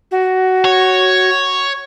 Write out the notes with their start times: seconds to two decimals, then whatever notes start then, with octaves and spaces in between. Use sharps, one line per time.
0.11 F#4
0.65 C#5